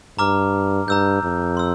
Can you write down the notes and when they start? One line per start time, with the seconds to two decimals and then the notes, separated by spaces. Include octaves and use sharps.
0.19 G2 A#5 D6 F6
0.88 G2 A#5 E6 G6
1.23 F2
1.57 C6 E6